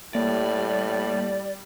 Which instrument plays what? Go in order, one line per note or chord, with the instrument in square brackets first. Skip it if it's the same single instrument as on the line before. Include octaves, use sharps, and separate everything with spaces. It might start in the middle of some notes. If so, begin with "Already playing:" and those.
[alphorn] A2 [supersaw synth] G3 [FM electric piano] A#3 [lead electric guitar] D5